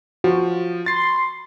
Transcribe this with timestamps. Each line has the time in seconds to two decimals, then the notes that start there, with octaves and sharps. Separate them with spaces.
0.24 F3 F#4
0.86 C6 A6 C7